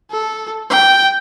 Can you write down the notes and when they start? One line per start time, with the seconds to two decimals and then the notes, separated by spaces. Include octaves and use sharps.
0.11 A4
0.70 G5